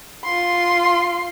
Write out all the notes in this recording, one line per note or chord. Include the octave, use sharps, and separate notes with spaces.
F4 C6